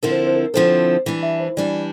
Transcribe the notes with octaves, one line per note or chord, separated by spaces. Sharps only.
D3 F3 C4 E4 A4 A#4
C5
A#4
C5
A#4
D3 F3 C4 E4 A4 C5
E3 G3 D4
E5
C5
E3 G3 D4 D5